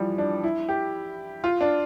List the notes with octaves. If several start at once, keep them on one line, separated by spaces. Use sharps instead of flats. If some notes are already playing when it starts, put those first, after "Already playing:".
Already playing: E3 F3 G3
D4
E4
G4
F4
D4